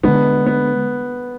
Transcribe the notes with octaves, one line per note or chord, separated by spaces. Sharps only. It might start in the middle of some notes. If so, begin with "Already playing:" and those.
D3 G#3 B3 D4
B3